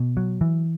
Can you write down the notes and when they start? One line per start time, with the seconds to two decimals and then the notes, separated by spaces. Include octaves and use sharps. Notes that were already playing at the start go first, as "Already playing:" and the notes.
Already playing: B2
0.17 F#3
0.41 E3